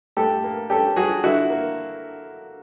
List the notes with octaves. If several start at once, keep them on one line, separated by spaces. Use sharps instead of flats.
A2 G4 A4
A#3
C#4 G4 A4
F#3 F#4 G#4
D3 E4 F#4
A#3